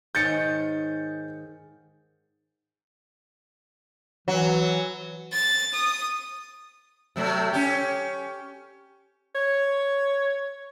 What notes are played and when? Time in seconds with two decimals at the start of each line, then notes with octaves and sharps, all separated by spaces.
0.15 G#2 D#3 C#5 G6 A6 C#7
4.28 E3 F#3
5.33 A6
5.74 D#6
7.16 C3 F#3 A3
7.53 C#4 G4
9.35 C#5